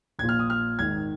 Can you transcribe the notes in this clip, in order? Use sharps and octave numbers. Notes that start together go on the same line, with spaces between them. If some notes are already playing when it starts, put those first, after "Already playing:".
A#1 A#2 G#6
F6
D#6
F6
G#1 G#2 D#3 G#6